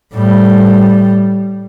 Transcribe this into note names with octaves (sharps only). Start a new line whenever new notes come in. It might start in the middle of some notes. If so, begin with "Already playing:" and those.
A2 G3